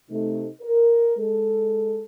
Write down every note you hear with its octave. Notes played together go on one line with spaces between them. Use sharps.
C3 A3 D#4
A#4
G#3 A4